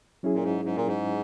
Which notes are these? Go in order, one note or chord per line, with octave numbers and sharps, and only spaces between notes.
F#3 C#4 E4 G#4
A#2
G#2
G#2
A#2
G#2